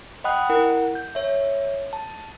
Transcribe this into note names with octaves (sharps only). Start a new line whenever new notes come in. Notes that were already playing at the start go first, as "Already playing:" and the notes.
D#5 F#5 G5 B5 D#6 F#6
E4 A#4 F#5
G6
C#5 E5
A5